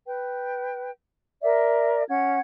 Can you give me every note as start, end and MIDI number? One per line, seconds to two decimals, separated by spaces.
0.06 0.91 71
0.06 0.91 79
1.42 2.03 70
1.42 2.03 74
1.42 2.03 76
2.09 2.39 61
2.09 2.39 78
2.09 2.39 92